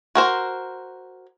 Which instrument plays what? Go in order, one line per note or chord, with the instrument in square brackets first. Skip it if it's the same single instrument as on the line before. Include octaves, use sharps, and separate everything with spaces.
[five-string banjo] F#4 A#4 C5